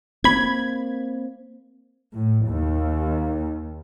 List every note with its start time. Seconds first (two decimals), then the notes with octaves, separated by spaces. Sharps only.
0.24 A#3 C4 B5 G#6
2.15 A2
2.48 D#2